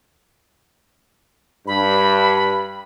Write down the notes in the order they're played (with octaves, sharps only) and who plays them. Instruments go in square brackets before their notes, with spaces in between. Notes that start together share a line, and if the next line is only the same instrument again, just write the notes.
[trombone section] G2 [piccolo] B5